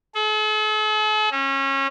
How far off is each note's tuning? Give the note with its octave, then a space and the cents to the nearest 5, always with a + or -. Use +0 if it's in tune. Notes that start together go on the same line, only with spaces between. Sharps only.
A4 -45
C#4 -25